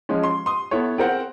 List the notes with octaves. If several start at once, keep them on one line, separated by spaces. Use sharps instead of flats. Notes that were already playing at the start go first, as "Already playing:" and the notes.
F3 G#3 C#4
C6
C6 D#6
B3 E4 A4 C#5
C4 G#4 A#4 C5 F#5